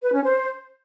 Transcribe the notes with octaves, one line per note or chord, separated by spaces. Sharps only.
B4
C#4
C5